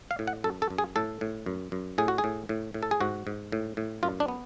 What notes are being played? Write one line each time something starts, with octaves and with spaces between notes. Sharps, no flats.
F5
A2
F#5
F#2 A4
A4
F#2
G#4
A2 A4
A2
F#2
F#2
A2 G#4
F#4
G#4
A2
A2
A2
A4
G#4
G#2 F#4
G#2
A2
A2
F#2 F4
D4
B3